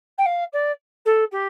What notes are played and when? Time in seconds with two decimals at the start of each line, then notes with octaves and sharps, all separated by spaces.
0.18 G5
0.26 F5
0.53 D5
1.05 A4
1.31 G4